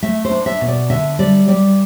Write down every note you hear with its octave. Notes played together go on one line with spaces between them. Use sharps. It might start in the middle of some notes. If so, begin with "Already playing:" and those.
A3 E5
C5
D4
E5
B2
D5
D3 E5
G3 D5
G3 D5